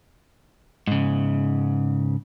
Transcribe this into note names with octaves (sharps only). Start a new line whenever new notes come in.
G#2 C#3